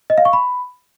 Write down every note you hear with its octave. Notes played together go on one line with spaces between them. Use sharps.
D#5
F5
C#6
B5